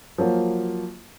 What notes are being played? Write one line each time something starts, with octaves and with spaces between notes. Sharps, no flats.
F3 F#3 A#3